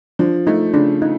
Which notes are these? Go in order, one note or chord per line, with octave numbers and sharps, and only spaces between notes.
F3 D4
A3 D#4
C#3 D4
D#4